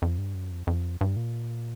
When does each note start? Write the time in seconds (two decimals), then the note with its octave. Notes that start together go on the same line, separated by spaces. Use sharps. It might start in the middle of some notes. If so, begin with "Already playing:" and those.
0.02 F2
0.18 G2
0.35 F#2
0.51 F2
0.67 F2
1.01 G2
1.16 A#2